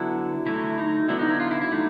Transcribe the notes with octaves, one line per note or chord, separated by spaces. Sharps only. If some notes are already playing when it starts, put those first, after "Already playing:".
Already playing: D3 F#3 B3 D4 E4
D3 F#3 A3 E4
D#4
D3 F#3 B3 D4 E4
D#4
E4
F4
E4
E4
F#3 A3 D4 D#4